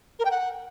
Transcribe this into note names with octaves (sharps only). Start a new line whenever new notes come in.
A#4
G5
F#5